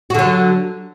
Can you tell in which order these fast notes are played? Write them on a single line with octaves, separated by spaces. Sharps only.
F#4 D3 F#3